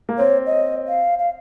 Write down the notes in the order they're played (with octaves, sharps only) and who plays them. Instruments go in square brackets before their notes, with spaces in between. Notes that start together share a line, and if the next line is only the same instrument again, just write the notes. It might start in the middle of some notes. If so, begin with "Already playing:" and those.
[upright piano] A#3
[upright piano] C4 [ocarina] C#5
[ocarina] D#5
F5
F5